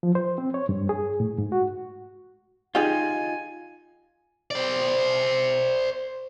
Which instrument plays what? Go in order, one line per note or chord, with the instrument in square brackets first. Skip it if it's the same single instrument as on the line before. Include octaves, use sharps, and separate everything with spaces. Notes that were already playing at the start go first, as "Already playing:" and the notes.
[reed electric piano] F3
C5
C4
C#5
G2
G#4
A2
G#2
F#4
[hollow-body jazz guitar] D#4 F4 [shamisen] G4 G#4 [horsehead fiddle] G#5
[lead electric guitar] C5 D5